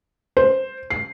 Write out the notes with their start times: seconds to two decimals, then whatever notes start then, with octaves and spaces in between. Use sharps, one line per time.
0.37 C5
0.90 C7